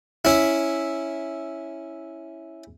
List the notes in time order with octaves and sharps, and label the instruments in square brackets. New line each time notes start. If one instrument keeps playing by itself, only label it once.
[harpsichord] C#4 E4